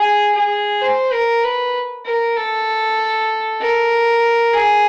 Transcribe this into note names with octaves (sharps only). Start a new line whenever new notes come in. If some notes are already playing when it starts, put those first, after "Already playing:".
Already playing: G#4
G#4
C5
A#4
B4
A#4
A4
A#4
G#4